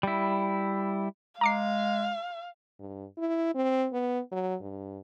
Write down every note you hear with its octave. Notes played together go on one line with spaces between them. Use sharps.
G3 E4
G#3 F5 A#5 D6 C7
G2
E4
C4
B3
F#3
G2